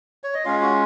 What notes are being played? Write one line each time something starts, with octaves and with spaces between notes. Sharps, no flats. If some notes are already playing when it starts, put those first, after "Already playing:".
C#5
D#5
G#3 C#4 F4 F5
F#4